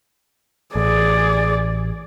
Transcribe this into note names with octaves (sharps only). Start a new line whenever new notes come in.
A1 G#4 D5